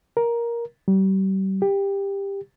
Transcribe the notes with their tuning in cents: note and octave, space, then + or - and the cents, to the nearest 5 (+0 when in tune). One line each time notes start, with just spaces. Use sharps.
A#4 +10
G3 -35
G4 +15